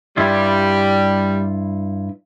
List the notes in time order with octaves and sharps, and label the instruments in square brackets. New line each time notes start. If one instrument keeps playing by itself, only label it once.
[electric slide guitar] G2 E4 F4 [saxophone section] G3